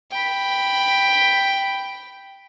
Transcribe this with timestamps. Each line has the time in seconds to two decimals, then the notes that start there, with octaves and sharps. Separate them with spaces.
0.12 G5 B5